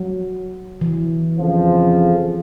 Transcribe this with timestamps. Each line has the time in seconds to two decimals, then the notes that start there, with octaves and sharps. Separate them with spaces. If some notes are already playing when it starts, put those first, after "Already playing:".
Already playing: F#3
0.81 E3
1.37 F2 C#3 F3